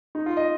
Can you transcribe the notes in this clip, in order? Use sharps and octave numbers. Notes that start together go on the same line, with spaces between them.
D#4
F4
D#5